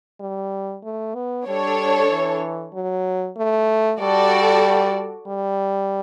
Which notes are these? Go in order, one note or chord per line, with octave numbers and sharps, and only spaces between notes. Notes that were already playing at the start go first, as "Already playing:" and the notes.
G3
A3
B3
G3 D4 A4 C#5
E3
F#3
A3
G3 F#4 A4 D5
G3